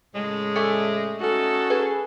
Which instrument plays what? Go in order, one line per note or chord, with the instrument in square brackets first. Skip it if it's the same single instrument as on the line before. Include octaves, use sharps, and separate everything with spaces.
[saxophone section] A2 C#3 G#3
[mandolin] A3 D5 G#5
[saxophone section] C#4 D#4 F#4 [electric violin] A4
[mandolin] G#4 [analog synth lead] B4